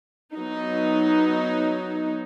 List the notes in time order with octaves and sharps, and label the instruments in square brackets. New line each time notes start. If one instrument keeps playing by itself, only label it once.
[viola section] F#3 B3 D#4